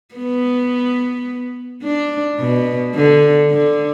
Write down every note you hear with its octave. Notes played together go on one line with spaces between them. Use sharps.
B3
D4
B2
D3
D3